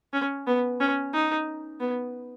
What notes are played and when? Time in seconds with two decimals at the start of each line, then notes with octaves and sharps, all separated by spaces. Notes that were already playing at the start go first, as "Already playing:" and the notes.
0.13 C#4
0.47 B3
0.80 C#4
1.14 D#4
1.80 B3